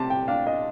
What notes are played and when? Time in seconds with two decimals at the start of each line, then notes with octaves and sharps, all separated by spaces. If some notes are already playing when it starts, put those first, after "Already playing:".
Already playing: C3 G4 A5
0.10 G5
0.28 D4 F5
0.47 D#5